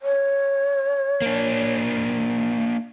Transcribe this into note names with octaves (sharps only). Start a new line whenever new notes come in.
C#5
A#3 D4